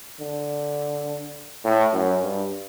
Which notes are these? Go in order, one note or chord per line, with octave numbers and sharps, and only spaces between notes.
D3
A2
F#2
G2